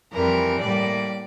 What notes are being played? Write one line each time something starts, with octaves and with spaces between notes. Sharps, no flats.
F2 E3 G3 A#4
A2 G3 A#3 D5